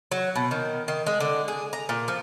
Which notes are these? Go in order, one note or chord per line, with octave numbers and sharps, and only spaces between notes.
F#3
B2
D#3
D#3
G#3
D3
G#4
A#5
A#2
F3